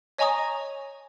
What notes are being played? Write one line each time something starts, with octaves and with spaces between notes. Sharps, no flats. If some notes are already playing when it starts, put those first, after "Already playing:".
C#5 D#5 G#5 A#5 C#6 D#6